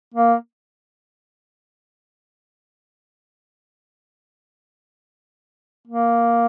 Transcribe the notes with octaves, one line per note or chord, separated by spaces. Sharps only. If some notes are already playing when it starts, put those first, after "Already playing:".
A#3
A#3